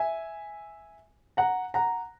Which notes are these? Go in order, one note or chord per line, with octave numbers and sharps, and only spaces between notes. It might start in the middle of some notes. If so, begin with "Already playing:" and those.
Already playing: E5 G#5
F#5 A#5
F#5 A#5